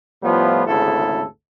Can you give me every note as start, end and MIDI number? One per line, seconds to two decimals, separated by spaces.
0.23 0.63 45
0.23 0.63 53
0.23 0.63 55
0.23 0.63 59
0.23 0.63 65
0.66 1.24 32
0.66 1.24 38
0.66 1.24 49
0.66 1.24 64
0.66 1.24 69